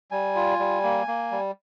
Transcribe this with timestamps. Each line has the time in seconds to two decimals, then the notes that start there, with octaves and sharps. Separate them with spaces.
0.11 G3 G#5
0.36 F4
0.59 G3
0.83 A#3
1.08 A#3
1.31 G3